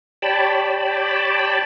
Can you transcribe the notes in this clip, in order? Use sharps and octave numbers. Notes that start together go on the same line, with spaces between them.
G4 C#5 D5 G5 A5 B5